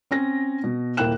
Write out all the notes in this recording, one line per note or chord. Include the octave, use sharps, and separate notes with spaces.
C4 C#4 A#6
B2
D#1 A#3 E4 G5 F#6 E7